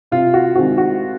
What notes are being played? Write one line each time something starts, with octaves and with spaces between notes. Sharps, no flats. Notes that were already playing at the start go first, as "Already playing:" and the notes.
C3 F4
F#4
D#3 G#3 C4 F#4
F#4